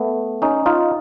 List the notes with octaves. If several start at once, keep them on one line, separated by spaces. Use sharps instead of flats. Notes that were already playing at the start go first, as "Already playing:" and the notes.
Already playing: A3 B3
C#4 D#4
D#4 F4